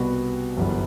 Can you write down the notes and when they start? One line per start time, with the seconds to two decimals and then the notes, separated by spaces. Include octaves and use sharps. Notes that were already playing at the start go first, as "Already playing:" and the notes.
Already playing: C2 B2 G3 B3 F#4
0.57 G1 F#2 E3 G3 B3